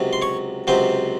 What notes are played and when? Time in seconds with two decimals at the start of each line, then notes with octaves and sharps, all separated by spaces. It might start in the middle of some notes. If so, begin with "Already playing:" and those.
Already playing: C#2 C3 F#3
0.13 C6
0.22 C#5 C#6
0.67 C#2 C3 F#3 C5 C6